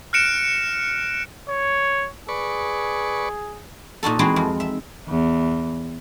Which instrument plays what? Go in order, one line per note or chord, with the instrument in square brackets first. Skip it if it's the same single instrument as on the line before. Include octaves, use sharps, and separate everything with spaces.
[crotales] F6 F#6 A#6 C#7 D7 E7
[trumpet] C#5
[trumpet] G#4 [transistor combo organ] B4 D5 C#6
[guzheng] A#2 D#4 F#4 A4
E3 G#3 C4 D#4 E4 F#4
F2
E5
[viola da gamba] E2